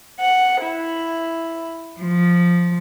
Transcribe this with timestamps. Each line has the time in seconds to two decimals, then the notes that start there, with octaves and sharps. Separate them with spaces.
0.20 F#5
0.62 E4
2.02 F3